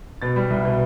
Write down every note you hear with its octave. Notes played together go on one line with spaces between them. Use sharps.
B2 A6
G3
C2
B2